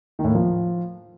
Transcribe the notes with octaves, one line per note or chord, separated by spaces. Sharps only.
D#3
A2
A#3
F3